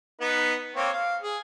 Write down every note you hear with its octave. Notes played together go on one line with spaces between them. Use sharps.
B3 D#4 B4
A#3 C4 C#5
F5
G#4